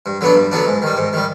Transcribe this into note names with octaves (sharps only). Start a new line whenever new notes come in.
G2
D3 F#3 B3 D4
G2
D3 F#3 B3 D4
G#2
D#3 G3
G#2
D#3 G3